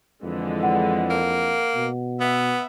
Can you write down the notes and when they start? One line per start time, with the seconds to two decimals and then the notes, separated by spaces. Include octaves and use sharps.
0.23 F2 D3 E3 G#3
0.63 F#5
1.10 A#3
1.75 B2
2.20 B3 E5